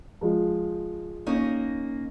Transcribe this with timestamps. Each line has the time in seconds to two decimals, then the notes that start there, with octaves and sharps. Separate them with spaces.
0.21 F3 G#3 F4
1.27 A#3 C#4 D#4